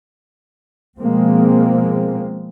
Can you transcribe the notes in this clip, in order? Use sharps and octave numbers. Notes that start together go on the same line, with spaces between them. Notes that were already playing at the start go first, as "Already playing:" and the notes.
B2 F3 G#3 A#3 C4